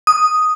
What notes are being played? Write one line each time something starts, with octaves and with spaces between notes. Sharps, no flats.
D#6